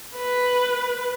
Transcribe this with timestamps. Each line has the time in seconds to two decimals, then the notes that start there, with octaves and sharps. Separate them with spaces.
0.16 B4